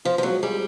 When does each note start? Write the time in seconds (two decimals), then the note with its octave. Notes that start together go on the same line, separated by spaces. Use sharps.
0.05 F3 F4
0.18 F3
0.23 F#3 G#3
0.43 G3 G#4